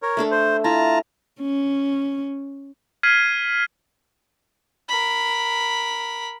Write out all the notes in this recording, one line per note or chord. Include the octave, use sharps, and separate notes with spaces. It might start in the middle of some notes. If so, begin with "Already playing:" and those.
A#4 C#5
A3 D4 A4
C5
E4 F4 A5 A#5
C#4
F6 G#6 B6 C7 D#7 F#7
A#4 B5